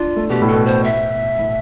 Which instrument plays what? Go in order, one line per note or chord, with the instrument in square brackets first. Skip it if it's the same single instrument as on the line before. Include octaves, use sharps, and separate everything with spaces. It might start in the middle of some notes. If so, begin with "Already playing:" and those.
Already playing: [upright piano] D4 [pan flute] F4
[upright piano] A3
[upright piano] B2 [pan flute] G4
[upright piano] A2
[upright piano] B2 [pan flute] A4
[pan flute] C5
E5
[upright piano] A2